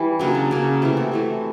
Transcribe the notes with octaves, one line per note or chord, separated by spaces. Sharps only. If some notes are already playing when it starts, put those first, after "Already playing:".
Already playing: E3 G3
C#3 F#3 A#3 D4
D4
C#3 F#3 A#3
C3 E3 A3
F#4
C3 E3 A3